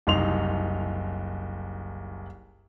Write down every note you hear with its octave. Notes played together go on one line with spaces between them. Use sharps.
F#1 C2 D#4 C6 F7